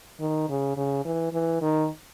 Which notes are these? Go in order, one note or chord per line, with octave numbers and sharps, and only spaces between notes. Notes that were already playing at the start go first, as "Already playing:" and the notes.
D#3
C#3
C#3
E3
E3
D#3